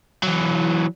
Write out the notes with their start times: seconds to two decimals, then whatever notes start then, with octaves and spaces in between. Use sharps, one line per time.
0.23 E3 F#3